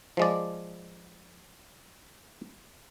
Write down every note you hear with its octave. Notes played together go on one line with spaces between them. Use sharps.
F3 G#3 D5